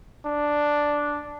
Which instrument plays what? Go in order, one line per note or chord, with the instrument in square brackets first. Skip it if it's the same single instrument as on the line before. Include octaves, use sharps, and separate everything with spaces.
[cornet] D4